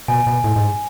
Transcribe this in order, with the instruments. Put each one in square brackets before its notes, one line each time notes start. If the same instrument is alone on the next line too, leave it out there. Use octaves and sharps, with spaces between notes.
[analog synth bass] B2 [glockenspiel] G#5
[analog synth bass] B2
A2
G#2